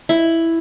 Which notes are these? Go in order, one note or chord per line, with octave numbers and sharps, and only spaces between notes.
E4